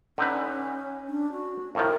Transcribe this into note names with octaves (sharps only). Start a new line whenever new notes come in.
D3 C#4 D#4 B4
D4
F#4
F2 A2 D#3 A#4